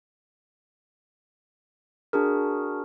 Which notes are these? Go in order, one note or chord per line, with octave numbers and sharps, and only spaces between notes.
D4 F#4 G#4 A#4